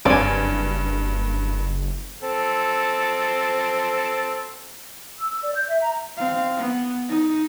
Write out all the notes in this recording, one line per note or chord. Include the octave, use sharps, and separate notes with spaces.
F#1 G2 C4 C#5 D5 G#5
C4 A4
E6
D5
G6
E5
A#5
C4 F5
B3
D#4